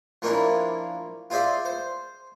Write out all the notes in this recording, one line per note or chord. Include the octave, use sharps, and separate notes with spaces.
F3 A#3 C#4 D4 E4
F4 G#4 C5 D5 E5 F5
C5